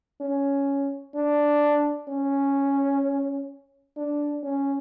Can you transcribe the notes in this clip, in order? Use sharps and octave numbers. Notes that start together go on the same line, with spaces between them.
C#4
D4
C#4
D4
C#4